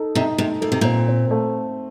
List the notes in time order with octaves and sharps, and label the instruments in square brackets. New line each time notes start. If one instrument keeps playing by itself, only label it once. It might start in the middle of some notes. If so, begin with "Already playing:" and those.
Already playing: [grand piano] D#4 A4
[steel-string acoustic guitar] C3 [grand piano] D#4
[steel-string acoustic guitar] C3 [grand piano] A3
[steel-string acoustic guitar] A#2 [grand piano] A4
[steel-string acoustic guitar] C3
[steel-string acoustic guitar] A#2 [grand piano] C4
[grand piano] C4
A3